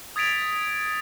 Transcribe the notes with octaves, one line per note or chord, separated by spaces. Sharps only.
D#6 G#6 A6 B6 D7 F7